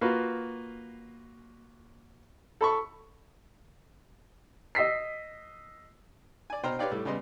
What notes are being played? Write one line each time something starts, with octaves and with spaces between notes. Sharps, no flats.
A#3 F4 F#4 B4
A4 B5 C#6
D#5 E6 B6 C7
D5 G#5
B2 C5 G5 A#5 F6
G4 B4 C#5 D5 F5 G5
A2 G3 A3
C#3 G3 B3 D#5 C6